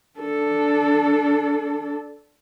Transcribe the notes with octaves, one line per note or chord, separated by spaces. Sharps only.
D4 A4